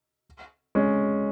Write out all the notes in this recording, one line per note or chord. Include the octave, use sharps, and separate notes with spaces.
G#3 C#4